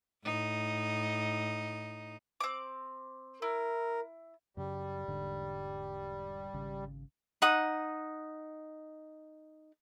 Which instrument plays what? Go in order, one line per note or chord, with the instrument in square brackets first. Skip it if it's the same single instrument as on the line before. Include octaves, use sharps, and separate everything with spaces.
[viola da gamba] A2 D#4
[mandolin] C4 D6
[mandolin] E4 [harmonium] A#4
[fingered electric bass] F#2 C#3 [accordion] G3
[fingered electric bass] E1 G#2 D3
G#1 C#3
[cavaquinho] D#4 F#5 D#6